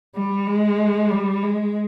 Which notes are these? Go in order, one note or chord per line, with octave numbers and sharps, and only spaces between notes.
G3
G#3
G3
G#3